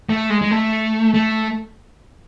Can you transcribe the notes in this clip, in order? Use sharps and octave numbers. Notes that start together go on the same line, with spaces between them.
A3
G#3
G#3
A3
A3